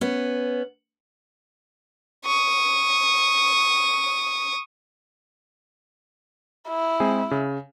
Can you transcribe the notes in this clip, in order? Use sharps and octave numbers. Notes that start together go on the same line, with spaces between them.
B3 C#4
C#6 D#6
E4
G#3 C4 G#4
C#3